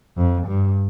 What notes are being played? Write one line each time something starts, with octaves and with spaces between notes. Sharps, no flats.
F2
G2